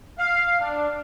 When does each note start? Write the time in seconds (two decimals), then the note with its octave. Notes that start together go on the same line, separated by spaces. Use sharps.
0.18 F5
0.59 D4